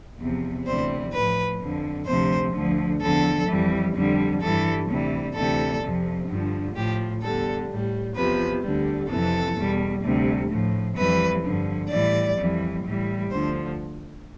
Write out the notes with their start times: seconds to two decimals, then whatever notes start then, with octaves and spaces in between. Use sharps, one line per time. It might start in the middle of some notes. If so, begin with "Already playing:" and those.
0.19 E2 C3 F3
0.66 D2 C3 E3 G3 C5
1.13 A2 F3 B4
1.59 F2 D3 F3
2.06 D2 C3 F3 C5
2.53 D2 D3 F3
3.00 E2 D3 F3 A4
3.47 F2 E3 G3
3.94 F2 D3 G3
4.40 G2 E3 G3 A4
4.88 D2 C3 E3 G3
5.34 D2 C3 E3 G3 A4
5.82 F2 C3 F3
6.27 G2 D3 F3
6.74 A2 F3 G4
7.22 E2 D3 G3 A4
7.69 A2 G3
8.15 E2 C3 F3 B4
8.63 D2 D3 G3
9.09 F2 C3 E3 A4
9.56 E2 B2 G3
10.02 D2 C3 G3
10.49 A2 F3
10.96 F2 E3 G3 B4
11.43 G2 D3 F3
11.89 A2 E3 G3 D5
12.37 F2 E3 G3
12.83 A2 E3 G3
13.30 D2 D3 F3 C5